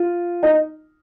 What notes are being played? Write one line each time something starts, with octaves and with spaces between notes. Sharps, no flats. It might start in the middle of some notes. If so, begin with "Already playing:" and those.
Already playing: F4
D#4